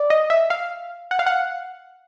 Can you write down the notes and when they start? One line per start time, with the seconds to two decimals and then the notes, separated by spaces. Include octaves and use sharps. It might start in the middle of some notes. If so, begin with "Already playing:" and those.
Already playing: D5
0.10 D#5
0.30 E5
0.50 F5
1.11 F#5
1.19 F5
1.26 F#5